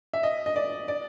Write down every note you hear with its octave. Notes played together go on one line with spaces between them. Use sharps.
E5
D#5
D#5
D5
D5